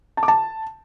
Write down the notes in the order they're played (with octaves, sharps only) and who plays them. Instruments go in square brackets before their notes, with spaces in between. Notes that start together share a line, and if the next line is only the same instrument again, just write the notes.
[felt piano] A5
D6
A5